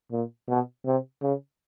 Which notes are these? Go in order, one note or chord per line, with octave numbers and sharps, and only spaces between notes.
A#2
B2
C3
C#3